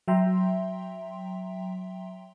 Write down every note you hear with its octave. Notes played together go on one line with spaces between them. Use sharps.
F#3 E5 G5 A#5 C6